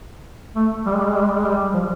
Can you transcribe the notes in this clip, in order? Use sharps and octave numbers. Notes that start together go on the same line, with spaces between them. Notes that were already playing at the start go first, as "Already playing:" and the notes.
A3
G3
G#3
G3
G#3
G3
G#3
G3
G#3
G3
F3